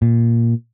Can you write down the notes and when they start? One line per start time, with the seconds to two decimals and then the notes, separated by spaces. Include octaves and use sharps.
0.02 A#2